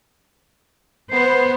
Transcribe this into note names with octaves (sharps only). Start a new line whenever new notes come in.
B3 C5